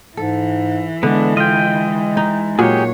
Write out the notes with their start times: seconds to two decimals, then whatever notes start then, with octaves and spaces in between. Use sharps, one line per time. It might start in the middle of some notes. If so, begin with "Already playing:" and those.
0.17 G#2 E3 A4
1.03 D3 G#3 B3 D4
1.37 F4 D#5 G5
2.17 D#4
2.59 A#2 F#3 G4 G#4 C#5